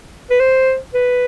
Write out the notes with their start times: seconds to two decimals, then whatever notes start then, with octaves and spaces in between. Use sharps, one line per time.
0.30 B4
0.40 C5
0.94 B4